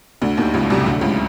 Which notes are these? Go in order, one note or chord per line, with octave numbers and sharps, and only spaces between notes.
D2 A2 D3 F#3 A3
D#2 D#3
C#2 C#3
C2 C3
D2 D3
C#2 C#3